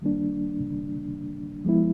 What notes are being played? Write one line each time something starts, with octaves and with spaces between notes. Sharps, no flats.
D#3 G3 A#3 D4
F3 G#3 B3 E4